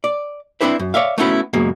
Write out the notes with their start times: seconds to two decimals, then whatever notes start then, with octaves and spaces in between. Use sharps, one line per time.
0.04 D5
0.61 C4 D4 E4 G4 B4 C5
0.79 F#2
0.94 C#5 D5 E5 F5
1.18 A3 B3 C#4 D#4 E4 F#4
1.53 C#2 F#2 B2 G#3 A#3